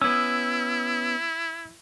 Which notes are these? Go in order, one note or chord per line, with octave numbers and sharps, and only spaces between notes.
B3 C#4 E4 E6